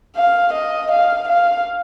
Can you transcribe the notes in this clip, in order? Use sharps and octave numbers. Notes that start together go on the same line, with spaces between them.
F5
D#5
F5
F5